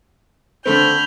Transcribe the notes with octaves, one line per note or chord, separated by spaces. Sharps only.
D3 A3 C4 B5 F6 G6